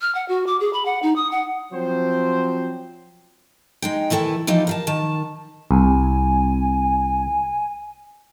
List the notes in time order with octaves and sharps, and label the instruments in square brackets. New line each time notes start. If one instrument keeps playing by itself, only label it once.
[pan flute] F6
F#5
F#4
D6
G#4
B5
F#5
D#4
D#6
F#5
[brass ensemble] F3 F#3 C4 C5
[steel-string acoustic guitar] G#3 D#4 G5
D#3 E3 E4 A4 B4
E3 F3 D#4 G4
A#4 F5 A5
D#3 A5
[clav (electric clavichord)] C2 [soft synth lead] G#5